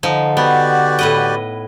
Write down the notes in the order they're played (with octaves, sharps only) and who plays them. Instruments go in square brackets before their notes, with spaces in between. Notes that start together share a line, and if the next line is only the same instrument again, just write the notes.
[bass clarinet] D3 [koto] F3 D#4
[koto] B3 [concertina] F#4 G4 D5
[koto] A2 B4 D#5